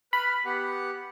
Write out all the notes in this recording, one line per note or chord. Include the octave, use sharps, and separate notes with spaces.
B4 B5 F6
B3 G4 F#5